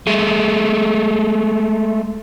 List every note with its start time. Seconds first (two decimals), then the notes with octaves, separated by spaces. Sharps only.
0.07 G#3 A3